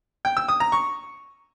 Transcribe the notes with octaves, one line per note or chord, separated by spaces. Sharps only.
G5
E6
D#6
A#5
C#6